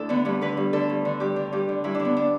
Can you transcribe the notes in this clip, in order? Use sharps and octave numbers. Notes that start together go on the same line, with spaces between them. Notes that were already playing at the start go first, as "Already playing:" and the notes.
Already playing: D2 A3 D4 E4 A4
D3 B3
G2 B3
D3 B4
G2
D3 A4
G2
D3
G2 G4
D3
G2 G4
D3
G2 E4
D3 D4
B3
D4